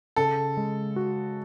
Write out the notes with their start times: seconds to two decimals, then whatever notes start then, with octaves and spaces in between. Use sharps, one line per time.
0.16 C#3 A4
0.57 G#3
0.96 F#4